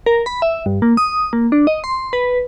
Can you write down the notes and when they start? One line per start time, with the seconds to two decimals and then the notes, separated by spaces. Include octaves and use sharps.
0.06 A#4
0.26 B5
0.42 E5
0.66 G2
0.82 A#3
0.97 D#6
1.33 A#3
1.52 D4
1.67 D#5
1.84 C6
2.13 B4